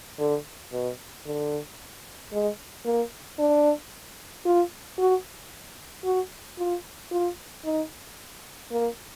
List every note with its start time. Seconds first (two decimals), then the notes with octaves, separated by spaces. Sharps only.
0.19 D3
0.73 B2
1.26 D3
2.32 G#3
2.85 A#3
3.39 D4
4.45 F4
4.98 F#4
6.04 F#4
6.58 F4
7.12 F4
7.64 D#4
8.71 A#3